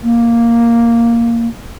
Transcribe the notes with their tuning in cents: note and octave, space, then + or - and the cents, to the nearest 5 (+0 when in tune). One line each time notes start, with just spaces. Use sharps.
A#3 +0